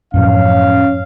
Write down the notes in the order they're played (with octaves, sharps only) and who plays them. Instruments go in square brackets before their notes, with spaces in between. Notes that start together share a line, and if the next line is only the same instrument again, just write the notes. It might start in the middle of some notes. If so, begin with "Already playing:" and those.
[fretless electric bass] F#2 A2 F3 [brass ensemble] C#4 F5